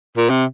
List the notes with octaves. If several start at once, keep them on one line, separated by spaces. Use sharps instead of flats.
A#2
C3